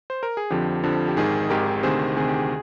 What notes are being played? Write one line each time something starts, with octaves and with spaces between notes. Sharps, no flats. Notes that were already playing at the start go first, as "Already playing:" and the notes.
C5
A#4
G#4
F2 D3 F3 G4
F2 D3 F3
G4
G#1 G#2 D#3 G#4
G#1 G#2 D#3 G4 A#4
D2 C3 D#3 G#4 C5
D2 C3 D#3 G#4
G4
G#4